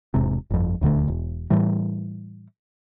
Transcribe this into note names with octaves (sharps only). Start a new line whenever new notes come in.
E1 G#2 C3
G1 F2
D#1 D2 D3 A3
E1
A2 E3 G3